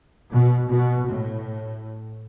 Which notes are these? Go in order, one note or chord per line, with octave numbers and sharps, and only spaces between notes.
B2
B2
A2